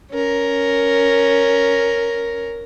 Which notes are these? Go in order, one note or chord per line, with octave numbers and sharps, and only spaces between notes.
C#4 A#4